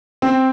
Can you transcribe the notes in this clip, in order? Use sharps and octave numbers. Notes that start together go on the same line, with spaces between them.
C4